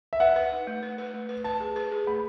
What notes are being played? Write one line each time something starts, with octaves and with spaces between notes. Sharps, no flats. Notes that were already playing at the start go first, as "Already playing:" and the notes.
E5
B4 F#5
B4
D#4
A3
B4
B4
A3
B4
B4 A5
G#4
B4
G#4
A3 B5